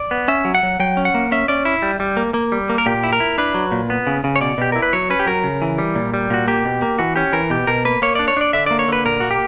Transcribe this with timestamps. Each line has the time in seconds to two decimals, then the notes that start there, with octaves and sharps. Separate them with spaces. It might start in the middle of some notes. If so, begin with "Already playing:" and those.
Already playing: D5
0.11 B3
0.28 C#4 E5
0.45 F#3
0.55 F#5
0.63 F#3
0.80 F#3 G5
0.97 C#4
1.05 F#5
1.14 A#3
1.32 C#4 E5
1.48 C#4 D5
1.65 E4
1.82 G3
2.00 G3
2.17 A#3
2.34 A#3
2.52 G3
2.70 A#3
2.78 A#4
2.86 A#2 G4
3.04 E4
3.13 A#4
3.20 E4
3.38 D4 B4
3.54 F#3
3.72 A#2
3.90 B3
4.07 C#3
4.24 C#3
4.36 C#5
4.41 B2 D5
4.58 B2 G4
4.72 E4 A#4
4.82 B4
4.93 F#3 C#5
5.10 C#4 B4
5.20 G4
5.26 F#3 A#4
5.44 C#3
5.62 E3
5.78 G3
5.95 A#2
6.14 G3
6.30 A#2 F#4
6.48 A#3 G4
6.65 B2
6.82 A#3
6.99 E3 F#4
7.16 C#4 G4
7.33 E3 A#4
7.50 B2 G4
7.67 B2 A#4
7.85 A#3 B4
8.02 A#3 C#5
8.15 D4 D5
8.28 C#5
8.37 D4 D5
8.53 D3 E5
8.66 A#3 D5
8.79 C#5
8.88 D3 B4
9.05 A#2 A#4
9.20 A#3 F#4
9.31 G4